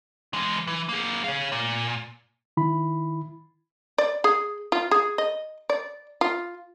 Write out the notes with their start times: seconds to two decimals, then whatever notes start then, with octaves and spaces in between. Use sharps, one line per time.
0.33 E3 G#3
0.67 E3
0.89 A#3 G#4
1.24 C#5 F5
1.52 A#2
2.57 D#3 E4 B5
3.98 D5
4.24 G#4
4.72 F4
4.91 G#4
5.18 D#5
5.70 D5
6.21 F4